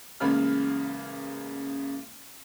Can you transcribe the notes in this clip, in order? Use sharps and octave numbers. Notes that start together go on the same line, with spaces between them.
A1 C#3 G#3 A#3 B5 F6